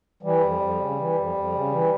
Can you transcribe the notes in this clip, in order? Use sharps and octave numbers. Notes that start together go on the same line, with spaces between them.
E3 G3
F2
F2
C#3
E3
F2
F2
C#3
E3